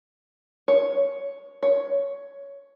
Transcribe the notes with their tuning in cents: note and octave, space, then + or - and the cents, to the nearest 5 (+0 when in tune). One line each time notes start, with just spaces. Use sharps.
C#5 +5
C#5 +10